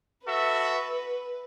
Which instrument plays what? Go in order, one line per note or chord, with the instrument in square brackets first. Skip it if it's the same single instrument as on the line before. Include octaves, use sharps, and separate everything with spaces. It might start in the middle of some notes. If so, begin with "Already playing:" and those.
[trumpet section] F#4 A4 E5 [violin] B4